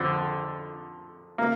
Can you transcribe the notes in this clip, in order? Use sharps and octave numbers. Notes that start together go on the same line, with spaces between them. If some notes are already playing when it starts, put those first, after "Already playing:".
Already playing: F2 D3
A#3